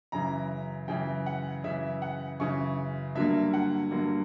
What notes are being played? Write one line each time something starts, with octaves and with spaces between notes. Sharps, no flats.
F#2 C#3 E3 A#5
F#2 C#3 E3 G5
F#5
F#2 C#3 E3 E5
F#5
F#2 C#3 E3 C#6
G2 D3 F#3 A#3 E5
F#5
G2 D3 F#3 A#3